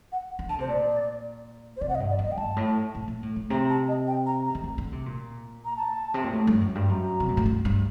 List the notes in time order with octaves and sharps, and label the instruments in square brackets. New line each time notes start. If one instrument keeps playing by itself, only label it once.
[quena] F#5
[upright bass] D#3
[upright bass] D3 [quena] A5
[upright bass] C3 [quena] C5
[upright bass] A#2 [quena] D5
[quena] C5
[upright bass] C3 [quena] D5
[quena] F#5
D#5
[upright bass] G2
[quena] D5
[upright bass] F#2
[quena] D#5
G5
[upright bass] G2 [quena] A5
[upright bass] A2
A#2
A#2
A2
A2
[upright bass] C3 [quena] A#5
[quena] A5
D#5
G5
A#5
A#5
[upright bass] D#3
D3
D3
C3
A#2
[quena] A#5
A5
[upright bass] C3
A#2
A2
G2
F#2
G2
[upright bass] F#2 [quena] A#5
[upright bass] C3
A#2
A2
G2
G2